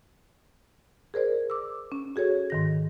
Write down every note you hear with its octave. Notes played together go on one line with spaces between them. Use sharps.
G#4 A#4 C5 D5
D6 E6
C#4
F#4 G#4 A4 C#5
G#2 D#3 A#6